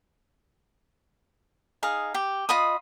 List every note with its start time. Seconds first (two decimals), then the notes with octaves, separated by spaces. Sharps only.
1.83 D#4 G#4 F5
2.14 G4
2.49 F4 D#5 B5 D#6